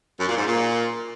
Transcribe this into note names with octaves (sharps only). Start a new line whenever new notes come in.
F#2
A#2
G#2
A#2